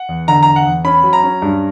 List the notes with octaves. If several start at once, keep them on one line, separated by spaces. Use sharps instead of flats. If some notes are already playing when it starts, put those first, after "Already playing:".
Already playing: F#5
E2
D3 A#5
E2 A#5
F#5
E2
C#4 B5
F#3
A#5
C#4
G2